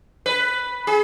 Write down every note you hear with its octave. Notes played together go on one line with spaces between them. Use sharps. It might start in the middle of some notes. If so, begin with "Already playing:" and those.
B4
G#4